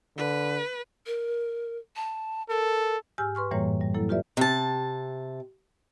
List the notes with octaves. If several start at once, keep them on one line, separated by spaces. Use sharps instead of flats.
D3 B4
A#4
A5
A4 A#4
G#2 G4 G#5 E6 F6 G6
B4 C6 C#6 F6
F#2 A2 E3 G3 A#3 C#5
G3
F#3 A#3 E4 A4
F4 G4 B4 D5 E5
C3 A5